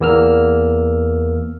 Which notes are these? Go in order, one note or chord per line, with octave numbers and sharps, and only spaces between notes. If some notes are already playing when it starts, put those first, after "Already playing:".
E2 A#3 E6 F6